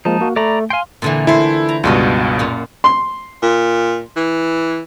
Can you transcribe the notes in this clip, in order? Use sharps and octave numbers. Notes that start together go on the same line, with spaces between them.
F3 G#3 A#3 D#4 A5
A#3 F#4
A3 D5 A#5 B5
F5 G5 G#5 C6
A#2 D3 E3
A3 E4 C5
A#5
C#2 G2 B2 F4 F#4 D#5
F#2 A#2
C6
A#2
E3